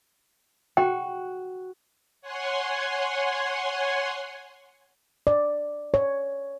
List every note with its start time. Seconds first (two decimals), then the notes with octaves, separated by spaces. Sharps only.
0.77 F#4 G5
2.22 C#5 F#5 G#5 C6
5.27 D5
5.94 C#5